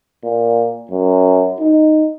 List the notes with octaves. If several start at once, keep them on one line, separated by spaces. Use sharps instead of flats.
A#2
F#2
D#4